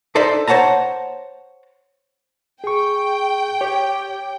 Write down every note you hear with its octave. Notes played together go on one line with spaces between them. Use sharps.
D4 D#4 A4 C5 D5 E5
C5 C#5 F#5 A5 A#5
G#4 G5 C#6
G4 C#5